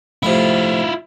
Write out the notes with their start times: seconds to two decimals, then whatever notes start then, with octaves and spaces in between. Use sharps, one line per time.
0.23 F2 A2 C3 E4 F4